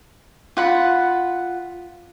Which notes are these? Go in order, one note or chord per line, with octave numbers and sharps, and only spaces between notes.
F4 F#5 B5